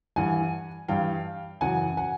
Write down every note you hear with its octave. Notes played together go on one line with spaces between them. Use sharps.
G2 E3 F#5 G#5
G2 E3 F5 G5
F#2 C#3 E3 F#5 G#5
F#5 G#5